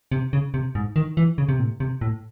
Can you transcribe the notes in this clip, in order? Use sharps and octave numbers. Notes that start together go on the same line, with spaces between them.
C3
C#3
C3
G#2
D#3
E3
C#3
C3
A2
C3
A2